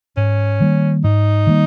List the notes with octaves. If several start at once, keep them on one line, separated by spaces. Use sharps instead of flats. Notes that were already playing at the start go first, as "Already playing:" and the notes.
G#2 C#4
D#3 G3 A#3
G#2 D#4
D#3 G3 A#3